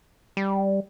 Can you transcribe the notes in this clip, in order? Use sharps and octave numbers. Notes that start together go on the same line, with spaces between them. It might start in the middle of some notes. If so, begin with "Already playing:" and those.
G3